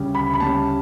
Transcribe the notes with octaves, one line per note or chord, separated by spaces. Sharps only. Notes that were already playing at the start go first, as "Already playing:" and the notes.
Already playing: D2 C#3 G3 C#4
D2 B5
B5
C#3 G3 C#4 A5